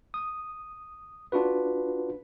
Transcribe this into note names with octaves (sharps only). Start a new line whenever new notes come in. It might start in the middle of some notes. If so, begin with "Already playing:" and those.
D#6
D4 F4 F#4 B4